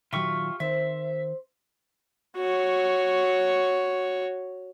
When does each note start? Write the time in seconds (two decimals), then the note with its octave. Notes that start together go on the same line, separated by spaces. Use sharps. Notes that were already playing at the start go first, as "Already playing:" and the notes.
0.13 A#2 D#3 F#3 F4 G4 E5 C#6
0.60 D#3 C4 C5 E5
2.37 F#4 C#5